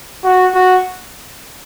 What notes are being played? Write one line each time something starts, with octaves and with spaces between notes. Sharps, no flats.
F#4
F#4